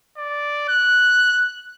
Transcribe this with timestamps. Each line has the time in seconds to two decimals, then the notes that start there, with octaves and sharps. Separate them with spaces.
0.17 D5
0.68 F#6